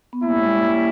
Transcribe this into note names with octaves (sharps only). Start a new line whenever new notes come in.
B3
G3 A#3 C#4 E4
G#3
A#3
A#3